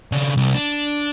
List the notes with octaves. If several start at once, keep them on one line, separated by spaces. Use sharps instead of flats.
C#3 D4
C2
D4